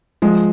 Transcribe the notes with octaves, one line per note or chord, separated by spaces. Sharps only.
F3 G#3